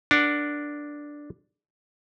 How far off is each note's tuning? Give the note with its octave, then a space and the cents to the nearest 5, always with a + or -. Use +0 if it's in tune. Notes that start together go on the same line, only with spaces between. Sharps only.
D4 +0 A#4 +0 F#5 +0